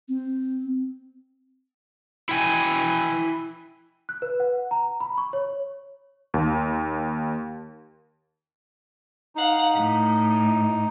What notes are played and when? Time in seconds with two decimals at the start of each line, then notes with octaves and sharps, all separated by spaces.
0.09 C4
2.29 E4 G5 G#5
4.09 F#6
4.22 B4
4.40 F#5
4.71 A#5
5.00 B5
5.18 C#6
5.33 C#5
6.34 D#2
9.35 D#4 F5 F#5
9.74 A2